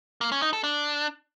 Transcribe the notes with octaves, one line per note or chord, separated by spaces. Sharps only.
A#3
C#4
D#4
A4
D4